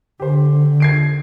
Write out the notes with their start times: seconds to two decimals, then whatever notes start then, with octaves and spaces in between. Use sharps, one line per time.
0.20 D3 G4 C5
0.80 G#6 C7 D7